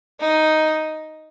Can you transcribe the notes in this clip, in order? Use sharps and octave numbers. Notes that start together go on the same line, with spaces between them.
D#4